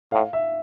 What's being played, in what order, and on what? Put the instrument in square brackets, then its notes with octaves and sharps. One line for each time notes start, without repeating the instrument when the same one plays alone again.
[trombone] A2 [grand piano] F5
[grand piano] E5